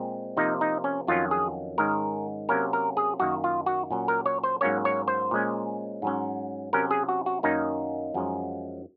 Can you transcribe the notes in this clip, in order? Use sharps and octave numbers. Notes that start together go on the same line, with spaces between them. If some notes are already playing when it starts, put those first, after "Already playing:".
Already playing: A#2 G#3 C4
C3 F3 A#3 D#4
D#4
C#4
F2 D#3 F#3 C#4 F4
G#4
G#2 D#3 G#3 C#4 A#4
C3 F#3 A#3 C#4 A#4
A#4
G#4
F#2 D#3 A#3 F#4
F4
F#4
A#2 F#3 C#4
A#4
C#5
C5
G#2 F#3 A#3 C#4 C#5
C#5
C5
A#2 G#3 C#4
G#2 F#3 C#4
C3 F#3 C#4 A#4
G#4
F#4
F#4
F#2 D#3 A#3 C#4 D#4
F#2 F3 G#3 C#4